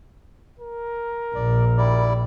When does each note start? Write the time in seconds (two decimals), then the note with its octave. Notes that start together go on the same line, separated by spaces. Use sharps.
0.59 A#4
1.35 A#1 D5
1.77 G3 E4 D5